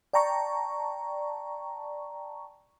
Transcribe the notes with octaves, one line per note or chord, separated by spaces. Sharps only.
D5 G5 A5 A#5 C#6